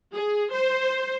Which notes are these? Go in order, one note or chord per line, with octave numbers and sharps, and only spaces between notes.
G#4
C5